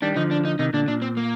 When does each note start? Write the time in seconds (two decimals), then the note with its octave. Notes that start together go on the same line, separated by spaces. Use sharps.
0.02 D#3 G3 D4
0.16 D3 F3 D#4
0.31 D4
0.45 D#4
0.59 C3 D#3 D#4
0.73 A#2 D3 D4
0.88 A#2 D4
1.02 C4
1.17 A#3